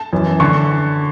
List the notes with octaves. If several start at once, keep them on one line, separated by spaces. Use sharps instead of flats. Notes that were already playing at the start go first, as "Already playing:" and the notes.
Already playing: A5
F#2 E3
D3 A5 C#6